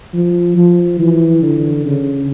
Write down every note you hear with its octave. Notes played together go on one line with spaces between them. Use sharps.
F3
F3
E3
D3
C#3